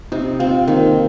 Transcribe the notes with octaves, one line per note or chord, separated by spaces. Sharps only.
C3 D#4
C4 F4
D#3 A#3